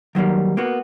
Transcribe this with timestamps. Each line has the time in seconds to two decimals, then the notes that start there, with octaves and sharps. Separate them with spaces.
0.15 D#3 F#3 G3 A#3
0.57 A#3 B3 F#4